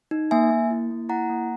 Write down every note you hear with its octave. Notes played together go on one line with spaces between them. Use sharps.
D#4
A#3 E5 G#5
A#3
E4
A#3
E4 F#5 A#5
A#3